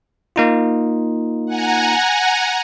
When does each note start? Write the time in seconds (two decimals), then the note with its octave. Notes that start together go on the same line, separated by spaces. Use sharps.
0.36 A#3 D#4 F4
1.46 F#5 G#5 A#5